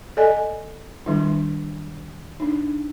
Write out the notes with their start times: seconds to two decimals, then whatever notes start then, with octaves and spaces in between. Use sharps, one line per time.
0.17 A4 D5 D#5 G#5
1.06 D#3 G3 D4 E4
2.40 D4 D#4